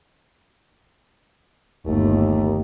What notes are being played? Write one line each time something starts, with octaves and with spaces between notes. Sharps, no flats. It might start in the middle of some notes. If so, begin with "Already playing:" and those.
G1 D#2 A3